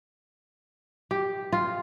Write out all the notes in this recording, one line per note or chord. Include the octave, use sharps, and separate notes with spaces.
G4
F4